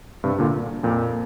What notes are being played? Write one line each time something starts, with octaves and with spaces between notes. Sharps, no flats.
G2 C3
A#2 D3
F2 A#2